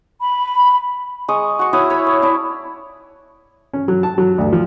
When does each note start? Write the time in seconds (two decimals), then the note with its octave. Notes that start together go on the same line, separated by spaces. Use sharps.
0.20 B5
1.28 G#3 C#6 D#6
1.59 F#4 C#6
1.73 E4 F#4 C#5 D#6
1.90 C#5 B5
2.06 C#5
2.22 E4 D5 A5 D6
3.74 C#4
3.88 F#3
4.03 A5
4.18 F#3
4.38 D2
4.53 F3